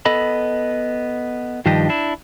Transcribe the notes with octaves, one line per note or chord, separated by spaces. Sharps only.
B3 A4 D#5 B5
G2 D#3 F3 D4 G4 D#5
D4 E4